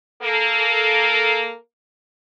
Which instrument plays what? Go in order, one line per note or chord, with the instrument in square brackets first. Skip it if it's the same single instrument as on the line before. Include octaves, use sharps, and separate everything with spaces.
[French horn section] A#3 A4